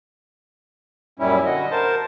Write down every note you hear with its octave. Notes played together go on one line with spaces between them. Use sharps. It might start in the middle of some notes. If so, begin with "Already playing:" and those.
F#2 A#2 G3 C#4 E4
D3 F#4 D#5
A#4 C5 A5